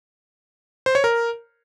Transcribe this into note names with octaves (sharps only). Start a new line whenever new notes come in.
C5
C#5
A#4